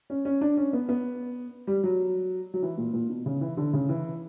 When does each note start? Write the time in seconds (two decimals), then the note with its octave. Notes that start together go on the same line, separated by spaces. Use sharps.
0.10 C#4
0.25 C#4
0.41 D4
0.57 C#4
0.73 B3
0.89 B3
1.67 G3
1.84 F#3
2.54 F#3
2.62 E3
2.78 A#2
2.94 A#2
3.09 B2
3.26 C#3
3.41 E3
3.57 D3
3.73 C#3
3.89 E3